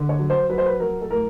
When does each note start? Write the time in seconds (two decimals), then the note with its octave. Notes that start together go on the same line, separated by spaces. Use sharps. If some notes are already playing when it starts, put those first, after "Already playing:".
Already playing: D3
0.09 C#5
0.19 F#3
0.30 C5
0.50 F#3 B4
0.58 C5
0.66 B4
0.80 F#3 A#4
1.01 A4
1.10 A2 A#4